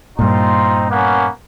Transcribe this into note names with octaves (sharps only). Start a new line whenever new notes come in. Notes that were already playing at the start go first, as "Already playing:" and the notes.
G2 A#2 C4 D#4 F4
A#3 B3 C#4